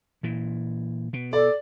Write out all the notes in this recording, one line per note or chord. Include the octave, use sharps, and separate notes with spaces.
A#2 E3
B2
A4 D5